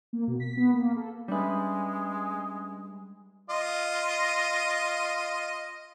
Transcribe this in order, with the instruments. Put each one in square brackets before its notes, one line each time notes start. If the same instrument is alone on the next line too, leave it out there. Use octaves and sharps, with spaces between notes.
[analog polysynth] A#3
B2
B6
B3
A#3
A4
[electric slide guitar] G3 B4 [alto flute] G#3 [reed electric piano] C#4 D4 E5
[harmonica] F4 D#5